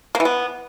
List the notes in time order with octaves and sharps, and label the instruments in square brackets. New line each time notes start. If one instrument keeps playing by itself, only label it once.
[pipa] A#3
E3
B3